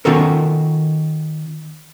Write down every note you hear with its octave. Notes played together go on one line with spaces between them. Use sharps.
D#3 C#4 F4 F#4 A4 A#4